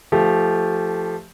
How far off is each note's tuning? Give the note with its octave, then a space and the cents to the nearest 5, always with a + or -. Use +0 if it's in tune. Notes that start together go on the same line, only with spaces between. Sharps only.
F3 -10 A3 +0 G4 +0